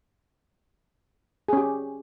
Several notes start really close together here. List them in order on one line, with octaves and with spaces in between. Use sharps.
G#4 C#4 G4